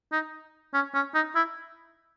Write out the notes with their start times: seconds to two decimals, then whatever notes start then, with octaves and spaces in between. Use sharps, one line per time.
0.12 D#4
0.74 C#4
0.94 C#4
1.14 D#4
1.35 E4